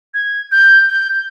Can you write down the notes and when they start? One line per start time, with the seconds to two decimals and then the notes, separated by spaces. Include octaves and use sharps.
0.14 G#6
0.52 G6
0.90 G6